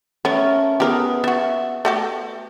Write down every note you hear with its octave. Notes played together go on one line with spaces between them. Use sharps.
A3 B3 C#4 A#4
B3 G4 G#4 A#4
B3 F#4 E5
A3 F#4 G4